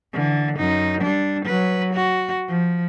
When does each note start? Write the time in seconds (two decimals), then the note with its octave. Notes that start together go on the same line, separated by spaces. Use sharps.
0.13 D3 E3
0.57 F#2 D#4
1.01 G3 D4
1.45 F#3 B4
1.94 F#4
2.48 F3